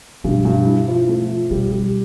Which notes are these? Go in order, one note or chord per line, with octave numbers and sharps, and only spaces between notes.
G2 B2
G2
E4
F3
A3
F3
B2 G3
G3